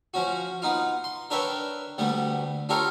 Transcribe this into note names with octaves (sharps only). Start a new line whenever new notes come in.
F3 C#4 F#4
B3 D#4 F4
C6
D4 A#4 B4 C#5 E5 G5
D2 G3 A3 B3
D4 F4 G4 A4 A#4 C#5